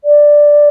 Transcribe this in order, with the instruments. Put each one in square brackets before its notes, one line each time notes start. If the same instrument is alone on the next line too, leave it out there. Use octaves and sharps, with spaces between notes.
[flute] D5